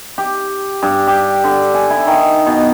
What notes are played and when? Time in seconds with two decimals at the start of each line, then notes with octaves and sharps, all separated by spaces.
0.18 G4
0.82 G2
1.07 G4
1.44 D3
1.74 G#5
1.90 E4
2.07 D#3
2.46 B2